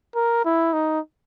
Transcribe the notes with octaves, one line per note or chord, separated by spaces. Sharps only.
A#4
E4
D#4